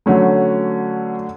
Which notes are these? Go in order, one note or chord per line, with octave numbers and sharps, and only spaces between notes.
D3 F#3 A3 C#4